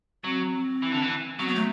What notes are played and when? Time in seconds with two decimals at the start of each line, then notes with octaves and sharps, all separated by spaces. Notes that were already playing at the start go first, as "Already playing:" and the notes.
0.24 F#3 C4
0.82 E3
0.92 D3
1.02 E3
1.39 F#3 C4
1.47 B3
1.55 A3